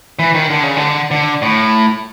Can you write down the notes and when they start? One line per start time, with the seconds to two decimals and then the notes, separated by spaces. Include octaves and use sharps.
0.19 E3
0.35 D#3
0.50 D3
0.63 C#3
0.77 D3
1.11 D3
1.42 A2